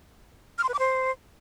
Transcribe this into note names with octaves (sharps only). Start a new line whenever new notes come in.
F6
C6
B4
D6
C5